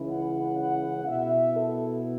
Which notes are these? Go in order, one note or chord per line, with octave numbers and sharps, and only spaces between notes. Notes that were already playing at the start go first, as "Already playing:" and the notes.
Already playing: C#2 C#3 E3 C#4 E4
F#5
F#5
B2 B3 E4 E5
A4